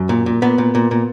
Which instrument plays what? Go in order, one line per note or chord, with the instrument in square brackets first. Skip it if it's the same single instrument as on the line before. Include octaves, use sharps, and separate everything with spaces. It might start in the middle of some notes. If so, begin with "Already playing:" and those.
Already playing: [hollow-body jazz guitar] F#2
A#2
A#2
A#2 B3
A#2
A#2
A#2